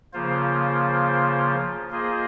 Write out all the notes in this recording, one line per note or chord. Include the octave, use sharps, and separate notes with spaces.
C#3 F3 A#3 F4 C5
A#3 F4 G#4 C5 D#5